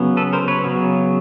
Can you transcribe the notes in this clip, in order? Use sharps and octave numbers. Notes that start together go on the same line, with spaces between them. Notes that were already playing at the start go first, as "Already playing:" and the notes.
Already playing: C#3 F#3 B3
A4 B4
A#4 C5
B4 C#5
C#3 F#3 B3